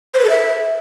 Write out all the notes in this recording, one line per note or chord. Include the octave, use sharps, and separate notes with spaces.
C5
B4
A4
E5